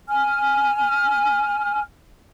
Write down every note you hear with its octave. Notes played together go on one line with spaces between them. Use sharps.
G#5 F6